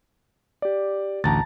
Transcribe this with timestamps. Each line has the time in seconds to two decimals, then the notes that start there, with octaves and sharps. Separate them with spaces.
0.62 G4 D5
1.24 A1 D2 A5 A#5 A6